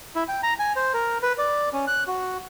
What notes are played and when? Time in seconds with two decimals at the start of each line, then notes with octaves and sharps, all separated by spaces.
0.16 E4
0.28 G5
0.43 A#5
0.60 G#5
0.76 C5
0.94 A#4
1.23 B4
1.38 D5
1.73 C#4
1.88 F#6
2.08 F#4